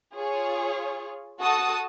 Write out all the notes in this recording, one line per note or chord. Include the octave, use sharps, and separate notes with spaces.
F4 G#4 C#5
F#4 A4 A5 D#6